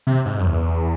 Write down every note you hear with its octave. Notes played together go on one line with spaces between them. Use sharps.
C3
G#2
F#2
E2